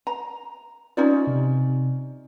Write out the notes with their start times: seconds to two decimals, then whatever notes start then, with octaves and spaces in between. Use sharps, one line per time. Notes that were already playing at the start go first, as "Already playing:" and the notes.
0.07 A#5
0.97 C#4 D#4 F4 D5
1.27 C3